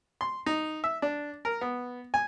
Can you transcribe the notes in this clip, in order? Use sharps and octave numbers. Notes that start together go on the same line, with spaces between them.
C6
D#4
E5
D4
A#4
B3
G#5